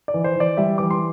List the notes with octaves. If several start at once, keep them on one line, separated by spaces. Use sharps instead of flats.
D5
E3
C5
E3 D5
G3 E5
E3 D6
C6